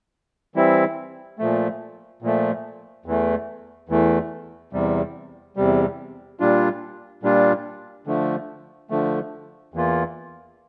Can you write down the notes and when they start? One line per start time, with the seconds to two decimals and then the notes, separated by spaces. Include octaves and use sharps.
0.55 E3 G3 C4 E4
1.39 A#2 F3 A3
2.22 A#2 F3 A3
3.06 E2 E3 A3
3.89 E2 E3 A3
4.73 E2 C3 G3
5.56 E2 C3 G3
6.40 A#2 G3 D4 F4
7.23 A#2 G3 D4 F4
8.07 D3 F3 A3
8.90 D3 F3 A3
9.74 E2 E3 A#3 F4